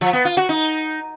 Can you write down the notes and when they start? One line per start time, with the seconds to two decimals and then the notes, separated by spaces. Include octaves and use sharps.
0.01 F3
0.13 B3
0.25 F4
0.37 F#4
0.49 D#4